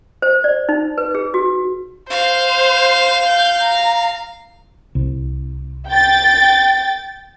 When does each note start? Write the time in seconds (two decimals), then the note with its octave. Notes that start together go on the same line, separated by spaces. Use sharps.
0.22 C5
0.44 D5
0.69 D#4
0.98 B4
1.15 G#4
1.34 F#4
2.11 C5 F5
3.26 G6
3.62 A#5
4.95 C2
5.88 G5 A6